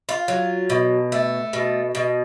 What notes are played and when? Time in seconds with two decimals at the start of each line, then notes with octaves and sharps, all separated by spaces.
0.09 F4
0.28 F#3
0.70 B2
1.12 A3
1.53 B2
1.95 B2